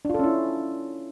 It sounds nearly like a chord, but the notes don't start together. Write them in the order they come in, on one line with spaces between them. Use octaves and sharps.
D4 F4 A4 C#4 E4